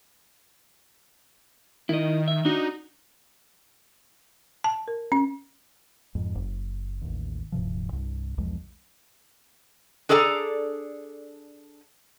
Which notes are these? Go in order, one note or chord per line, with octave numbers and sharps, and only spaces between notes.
D#3 E4 D#5
E5
D4 D#4 F#4
A5
A#4
C#4
F2 G#2
F#1
A1 D#2
D1 G2 C3 F3
C2 G2
B1 E2 F3 G#3
D4 G#4 A4 D5 F#5 A#5